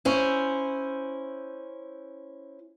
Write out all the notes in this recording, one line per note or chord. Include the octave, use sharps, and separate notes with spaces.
C#4 E4 C5